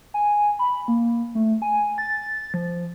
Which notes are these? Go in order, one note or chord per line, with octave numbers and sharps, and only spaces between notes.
G#5
B5
A#3
A3
G#5
A6
F3